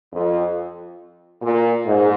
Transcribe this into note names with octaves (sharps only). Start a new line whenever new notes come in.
F2
A#2
G#2